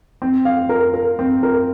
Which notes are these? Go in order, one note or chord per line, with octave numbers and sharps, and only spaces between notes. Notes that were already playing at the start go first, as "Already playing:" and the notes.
C4
F5
A#4
A#4
C4
A#4